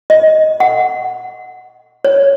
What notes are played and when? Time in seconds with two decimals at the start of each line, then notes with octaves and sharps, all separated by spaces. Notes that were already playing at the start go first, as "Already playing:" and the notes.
0.10 D#5
0.60 F#5
2.05 C#5